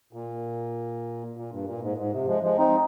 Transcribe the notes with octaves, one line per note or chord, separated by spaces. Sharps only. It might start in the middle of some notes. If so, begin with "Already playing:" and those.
A#2
A#2
G2
A#2
G#2
G#2
C3
F3 G#3
F3 G#3
C4 D#4